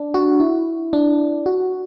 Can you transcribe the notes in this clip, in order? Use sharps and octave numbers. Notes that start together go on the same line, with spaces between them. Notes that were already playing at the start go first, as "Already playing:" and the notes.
Already playing: D4
F#4
E4
D4
F#4